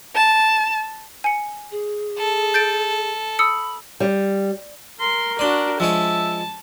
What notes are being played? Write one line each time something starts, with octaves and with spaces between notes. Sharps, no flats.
A5
G#5 C#7
G#4
A4
G6 A6 D7
B5 D#6 E6 C#7
G3
A#4 C6
D4 F#4 D5 C6
F3 G#3 C#5 E5 A5